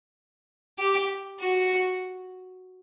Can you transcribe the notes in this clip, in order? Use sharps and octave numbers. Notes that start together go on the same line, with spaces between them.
G4
F#4